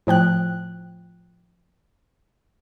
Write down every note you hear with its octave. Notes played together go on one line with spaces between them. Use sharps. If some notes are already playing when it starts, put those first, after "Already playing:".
A2 F3 G5 F#6